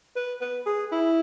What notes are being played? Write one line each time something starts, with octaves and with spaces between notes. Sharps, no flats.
B4
B4
G#4
E4